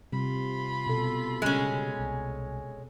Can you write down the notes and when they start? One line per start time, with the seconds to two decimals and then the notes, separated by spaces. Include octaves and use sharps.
0.12 C3 G3 F4 B5
0.86 B2 A4
1.42 C#3 G3 G#3 C#4
1.99 C2